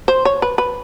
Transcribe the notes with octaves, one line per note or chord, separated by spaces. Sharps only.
C5
C#5
B4
B4